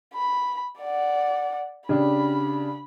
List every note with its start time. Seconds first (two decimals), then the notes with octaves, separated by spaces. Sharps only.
0.14 B5
0.80 D5 F#5
1.89 C#3 D4 G4 B5